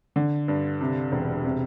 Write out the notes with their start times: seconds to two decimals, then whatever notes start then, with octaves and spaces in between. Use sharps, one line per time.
0.16 D3
0.48 G2
0.81 C3
1.12 E1
1.44 C3